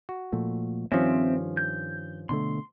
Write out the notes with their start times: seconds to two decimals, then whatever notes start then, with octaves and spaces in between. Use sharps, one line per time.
0.09 F#4
0.32 A#2 F3 A3
0.92 G2 D#3 F3 C4 C#4 E5
1.57 G6
2.29 B2 D3 A3 C6